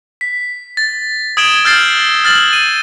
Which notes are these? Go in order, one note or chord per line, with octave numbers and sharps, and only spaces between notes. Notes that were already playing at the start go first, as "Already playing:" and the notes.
B6
A6
D#6 G#6 D7 E7 G7
E6 F6 G6 A6 C7
F6 A6 F#7
D#7